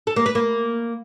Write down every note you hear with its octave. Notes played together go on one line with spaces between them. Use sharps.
A4
A#3
B4
A#3